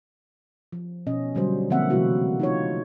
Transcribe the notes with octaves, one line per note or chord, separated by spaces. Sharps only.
F3
B2 C#4 D#5
D3 F#3 G3 C5
D3 F3 A#3 C4 E5 F#5
C3 E3 F#3 A3 E4 F#4
D#4 F4 C#5